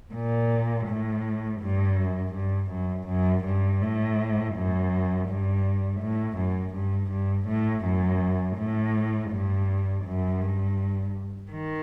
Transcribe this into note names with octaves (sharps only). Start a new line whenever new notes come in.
A#2
A2
G2
F#2
G2
F#2
F#2
G2
A2
F#2
G2
A2
F#2
G2
G2
A2
F#2
A2
G2
F#2
G2
D#3